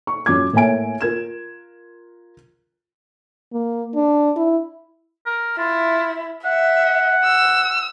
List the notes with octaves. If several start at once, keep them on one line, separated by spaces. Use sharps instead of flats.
C#6
F#2 F4 D6 G#6
A2 A#3 C#5 E5 G#5 D7
F4 A#4 G#6 E7
A#3
D4
E4
A#4
E4 F4
E5 F#5
E6